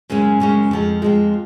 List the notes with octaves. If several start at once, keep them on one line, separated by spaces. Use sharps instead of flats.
F#2 C#3 G#3 C#4
F#2 C#3 G#3 C#4
F2 F3 G#3
F2 F3 G#3